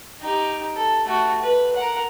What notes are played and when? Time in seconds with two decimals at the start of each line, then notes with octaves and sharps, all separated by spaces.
0.21 D#4 G4
0.76 A4
1.06 A3 F#4
1.42 B4
1.76 A#4 F#5